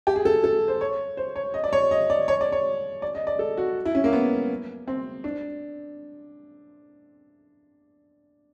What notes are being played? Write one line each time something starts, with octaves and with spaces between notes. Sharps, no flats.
G4
G#4
A4
A4
C5
C#5
C5
C#5
D#5
D5
C#5
D#5
D5
C#5
D5
C#5
D5
D#5
D5
A4
F#4
E4
C#4
A#3
B3
C4
D4